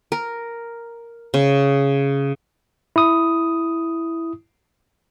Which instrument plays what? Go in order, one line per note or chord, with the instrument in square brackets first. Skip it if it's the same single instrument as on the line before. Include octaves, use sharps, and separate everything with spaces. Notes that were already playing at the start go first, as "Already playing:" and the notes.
[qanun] A#4
C#3
[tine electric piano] E4 D#6